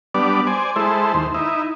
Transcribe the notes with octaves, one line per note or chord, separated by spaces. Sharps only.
G3 B3 D4 D5
C5 D5 G#5
G#3 E4 A4 C5
D#2 C5
D#4 E4